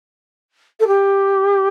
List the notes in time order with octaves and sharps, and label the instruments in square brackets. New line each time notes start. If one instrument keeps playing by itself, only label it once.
[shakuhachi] A4
G4